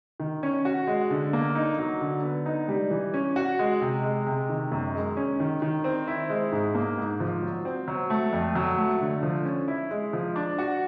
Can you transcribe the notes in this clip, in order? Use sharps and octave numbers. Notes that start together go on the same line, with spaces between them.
D#3
C#4
F#4
G#3
D3
A#3
D#4
F#3
D3
B3
D#4
G3
E3
C#4
F#4
G#3
C3
G#3
C3
D#3
F#2
G#3
C#4
D#3
D#3
C4
E4
G#3
G#2
A#3
G#2
F3
F#3
C4
F#3
A3
F2
F#3
A3
D3
F3
C#4
E4
G#3
F3
D4
F#4